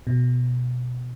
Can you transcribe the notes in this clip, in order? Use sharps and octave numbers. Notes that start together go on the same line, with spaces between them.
B2